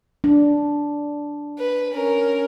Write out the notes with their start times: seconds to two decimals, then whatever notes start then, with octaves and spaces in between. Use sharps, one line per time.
0.24 D4
1.59 B4
1.93 C#4 A#4